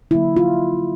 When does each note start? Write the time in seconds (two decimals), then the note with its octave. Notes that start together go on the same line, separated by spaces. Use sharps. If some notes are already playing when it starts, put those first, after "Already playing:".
0.11 D3 F#3 A#3 E4
0.36 F4